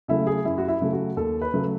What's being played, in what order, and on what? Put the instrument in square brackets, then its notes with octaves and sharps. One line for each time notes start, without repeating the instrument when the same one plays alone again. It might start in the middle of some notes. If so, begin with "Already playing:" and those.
[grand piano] C#3 F#3 A3 E4
G#4
F#2 E4
F#4
E4
C#3 F#3 A3
F#4
D#2 A4
B4
C#3 F#3 A3